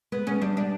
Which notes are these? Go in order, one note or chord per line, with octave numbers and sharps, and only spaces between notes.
G#3 B3
G#3 C#4
G3 D4
D4